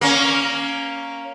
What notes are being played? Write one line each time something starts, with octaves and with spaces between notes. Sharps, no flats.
A#3 C#4